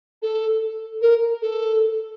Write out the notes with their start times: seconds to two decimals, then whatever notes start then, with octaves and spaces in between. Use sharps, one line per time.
0.22 A4
1.02 A#4
1.42 A4